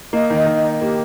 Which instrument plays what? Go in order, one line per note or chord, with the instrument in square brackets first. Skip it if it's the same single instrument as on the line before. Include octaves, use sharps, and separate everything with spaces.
[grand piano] A#3 [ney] D#5
[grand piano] D#3
[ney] D#5
[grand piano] D#3
D#4
[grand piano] A#3 [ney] G4